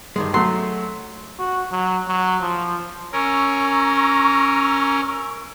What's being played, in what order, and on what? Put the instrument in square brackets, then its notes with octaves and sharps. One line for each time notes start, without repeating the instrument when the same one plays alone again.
[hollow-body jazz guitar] G2 D#3 G#3
[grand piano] F#3 A3 [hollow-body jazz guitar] C6
[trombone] F#4
F#3
F#3
F3
[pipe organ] C#4 A#4 [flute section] A#5 C#6 E6